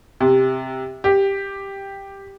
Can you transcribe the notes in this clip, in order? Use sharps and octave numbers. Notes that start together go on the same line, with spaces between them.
C3
G4